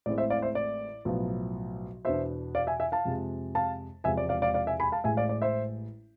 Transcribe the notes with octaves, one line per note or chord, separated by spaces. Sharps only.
A1 A2 G#3 C4 D5
C5 E5
D5 F5
C5 E5
D5
B1 A2 F3 B3
E2 B2 B3 D4 C5 E5
D5 F5
E5 G#5
E5 G#5
F5 A5
F2 C3 G#3
F5 A5
E1 E2 C3 F3 G#3 E5 G#5
D5
D5 F5
D5 F5
D5 F5
E5 G#5
G#5 B5
F5 A5
A1 A2 G#3 E5 G#5
D5 F5
D5
C5 E5